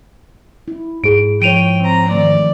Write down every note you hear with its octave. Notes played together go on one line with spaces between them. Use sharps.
E4
G#2 G#4 D7
F3 C#5 G5 D7 D#7 F7
C4 A#5
D#3 E3 A3 D5